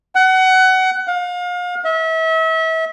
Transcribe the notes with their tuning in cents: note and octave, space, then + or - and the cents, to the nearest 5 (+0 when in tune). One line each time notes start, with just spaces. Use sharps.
F#5 +25
F5 +35
E5 -35